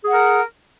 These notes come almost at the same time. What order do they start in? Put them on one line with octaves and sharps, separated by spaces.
G#4 F#5 A#4